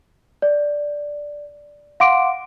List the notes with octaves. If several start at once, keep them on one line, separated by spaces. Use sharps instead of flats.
D5
F5 F#5 C6 D6 D7